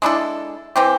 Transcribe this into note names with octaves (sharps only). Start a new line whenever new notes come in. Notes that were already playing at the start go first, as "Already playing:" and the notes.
G#3 D4 E4 A4
E3 C4 G4